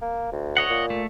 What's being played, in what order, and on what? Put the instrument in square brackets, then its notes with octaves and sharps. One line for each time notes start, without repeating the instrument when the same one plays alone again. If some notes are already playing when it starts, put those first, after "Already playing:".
[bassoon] A#3
D2
[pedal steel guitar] C#5 D#5 F#5
[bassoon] A#2
[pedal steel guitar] A3